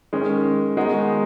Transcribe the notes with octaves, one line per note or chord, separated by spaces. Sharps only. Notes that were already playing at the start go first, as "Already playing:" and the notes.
D#3 G#3 C#4
D#3 G#3 B3 D#4 F#4